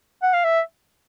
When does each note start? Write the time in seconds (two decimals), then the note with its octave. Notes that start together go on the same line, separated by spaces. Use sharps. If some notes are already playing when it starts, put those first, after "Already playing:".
0.23 F#5
0.33 F5
0.44 E5